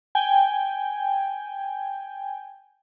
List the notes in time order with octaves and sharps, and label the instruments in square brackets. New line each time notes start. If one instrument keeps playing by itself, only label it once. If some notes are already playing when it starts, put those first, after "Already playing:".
[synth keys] G5 G#5